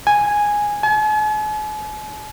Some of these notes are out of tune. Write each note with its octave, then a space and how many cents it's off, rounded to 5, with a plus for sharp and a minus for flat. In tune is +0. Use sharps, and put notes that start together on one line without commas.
G#5 -5
G#5 +45